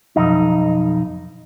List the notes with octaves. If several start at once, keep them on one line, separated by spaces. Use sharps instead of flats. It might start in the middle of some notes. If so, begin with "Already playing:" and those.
B1 F2 D#4